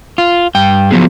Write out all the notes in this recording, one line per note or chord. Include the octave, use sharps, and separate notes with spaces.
F4
G2 G5
F3 F#3 B3 G#4